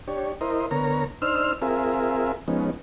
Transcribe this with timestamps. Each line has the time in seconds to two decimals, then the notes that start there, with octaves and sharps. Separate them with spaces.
0.08 D4 G4 C#5
0.41 E4 A#4 C5 D#5
0.71 D3 B3 A#4 C#5 A#5
1.22 D4 D#4 C5 E6 F6
1.62 C4 F4 G#4 A#4 E5
2.48 F3 G#3 B3 C#4 D#4